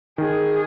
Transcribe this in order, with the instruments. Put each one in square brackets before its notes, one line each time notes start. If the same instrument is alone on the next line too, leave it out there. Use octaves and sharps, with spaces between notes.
[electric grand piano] D#3 [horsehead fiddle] G#4